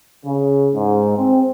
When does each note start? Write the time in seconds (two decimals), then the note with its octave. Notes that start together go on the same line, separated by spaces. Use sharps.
0.25 C#3
0.74 G#2
1.17 C4